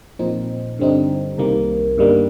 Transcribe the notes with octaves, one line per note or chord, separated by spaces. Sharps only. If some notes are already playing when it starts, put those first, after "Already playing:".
A#2 F3 C4 D#4
G2 D3 G3 C4 D#4
C2 C3 D#3 A#3
G1 G2 D#3 G3 A#3